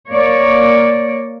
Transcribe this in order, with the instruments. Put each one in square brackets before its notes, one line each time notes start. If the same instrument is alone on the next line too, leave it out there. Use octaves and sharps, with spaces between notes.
[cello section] A#3 C#5 D5